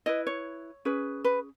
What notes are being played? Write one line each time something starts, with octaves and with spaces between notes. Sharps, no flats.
E4 B4 D#5
C#5
C#4 G#4 B4
B4